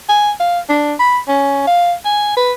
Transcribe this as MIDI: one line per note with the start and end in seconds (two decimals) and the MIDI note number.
0.09 0.31 80
0.40 0.59 77
0.69 0.94 62
0.99 1.18 83
1.28 1.64 61
1.67 1.93 77
2.05 2.34 80
2.37 2.53 71